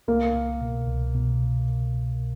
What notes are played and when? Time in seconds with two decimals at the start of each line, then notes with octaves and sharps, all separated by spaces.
0.08 C2 A#3
0.35 C2
0.61 B2
0.88 C2
1.15 B2